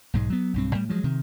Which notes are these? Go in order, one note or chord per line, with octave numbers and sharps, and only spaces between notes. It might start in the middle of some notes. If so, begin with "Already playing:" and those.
B1 G#2 G#3
F#3 B3
B1 G2 C4
A2 G3
F3 F#3 G#3
C3 D#3